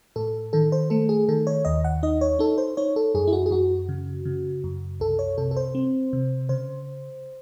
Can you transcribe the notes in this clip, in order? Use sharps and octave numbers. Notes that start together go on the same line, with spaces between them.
A2 A4
D#3 A4
C5
A3 A4
G#4
D#3 A4
C#5
D#2 D#5
F#5
D#4 D#5
C#5
D#4 A4
C5
D#4 C#5
A4
F#2 G#4
E4
F#4
G#4
F#2 F#4
C#3
C#3
F#2
C2 A4
C#5
C3 A4
A4
C5
C4
C3
C#3 C5